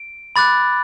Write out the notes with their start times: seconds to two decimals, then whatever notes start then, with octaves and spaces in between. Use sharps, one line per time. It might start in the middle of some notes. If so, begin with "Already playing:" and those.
Already playing: D7
0.36 B5 D6 F#6 A6